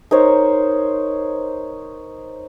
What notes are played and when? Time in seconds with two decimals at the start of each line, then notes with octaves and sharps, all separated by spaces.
0.11 D#4 A#4 C5 C#5